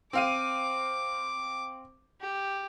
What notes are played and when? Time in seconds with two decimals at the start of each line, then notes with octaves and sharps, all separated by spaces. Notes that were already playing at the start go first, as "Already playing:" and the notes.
0.13 C4 F5 D6 D#7
2.21 G4